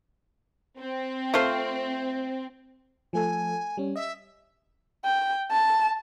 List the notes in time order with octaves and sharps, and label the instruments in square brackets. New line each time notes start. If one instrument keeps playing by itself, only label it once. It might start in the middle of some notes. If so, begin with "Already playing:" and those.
[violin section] C4
[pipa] A3 F4 C5
[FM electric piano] F3 A3 A4 [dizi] G#5
[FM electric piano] G3 C#4
[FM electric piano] D#5 [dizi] E5
[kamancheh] G5
A5